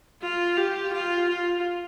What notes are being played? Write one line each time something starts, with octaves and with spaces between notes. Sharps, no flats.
F4
G4
F4
F4